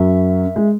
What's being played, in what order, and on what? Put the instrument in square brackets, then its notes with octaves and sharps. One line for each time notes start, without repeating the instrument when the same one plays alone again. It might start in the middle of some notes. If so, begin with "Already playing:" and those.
Already playing: [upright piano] F#2 F#3 [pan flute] E5
[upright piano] G#3